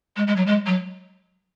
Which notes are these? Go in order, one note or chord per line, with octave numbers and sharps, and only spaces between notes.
G#3
G#3
F#3
G#3
F#3